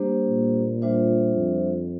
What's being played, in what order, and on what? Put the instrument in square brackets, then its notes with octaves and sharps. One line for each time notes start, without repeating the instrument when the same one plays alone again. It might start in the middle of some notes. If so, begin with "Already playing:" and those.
Already playing: [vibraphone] G3 A#3 D4 G4 C5
[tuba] A#2
[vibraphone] G3 D4 F4 C5 E5
[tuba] F2